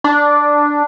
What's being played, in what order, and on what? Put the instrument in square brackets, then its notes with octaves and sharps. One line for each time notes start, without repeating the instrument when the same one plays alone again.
[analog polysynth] D4